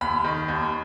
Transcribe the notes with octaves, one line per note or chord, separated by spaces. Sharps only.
D#2 B5
D#3
D#2